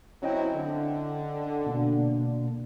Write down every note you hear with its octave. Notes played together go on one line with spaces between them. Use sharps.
F#3 C4 C#4 E4 D#5 G5
D3
B2 A#3 D4